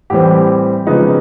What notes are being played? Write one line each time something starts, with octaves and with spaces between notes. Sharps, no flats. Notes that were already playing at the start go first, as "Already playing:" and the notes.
A2 E3 G3 C4 G4
C#3 F3 G#3 B3 D#4